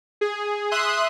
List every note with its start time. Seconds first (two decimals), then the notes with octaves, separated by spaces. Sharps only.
0.21 G#4
0.71 E5 C6 D#6 F#6